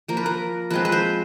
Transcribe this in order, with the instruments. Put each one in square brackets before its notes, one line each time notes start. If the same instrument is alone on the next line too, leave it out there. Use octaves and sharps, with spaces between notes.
[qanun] F3 A#3 A#4
B4
A#4
F3 G#3 C4 B4
B4
C5